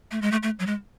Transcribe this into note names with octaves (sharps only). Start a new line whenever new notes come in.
A3
G#3
A3
A3
F#3
G#3